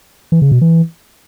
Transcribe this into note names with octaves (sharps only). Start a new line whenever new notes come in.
E3
C#3
B2
E3